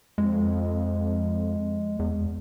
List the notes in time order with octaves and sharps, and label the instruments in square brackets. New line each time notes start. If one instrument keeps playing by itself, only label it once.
[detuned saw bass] F2 [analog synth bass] G#3
[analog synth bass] E2